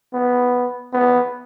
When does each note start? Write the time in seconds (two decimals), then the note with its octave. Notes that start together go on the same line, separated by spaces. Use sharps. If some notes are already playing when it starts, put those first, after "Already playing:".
0.14 B3
0.93 B3